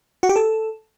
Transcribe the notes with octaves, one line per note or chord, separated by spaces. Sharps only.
F#4
G4
A4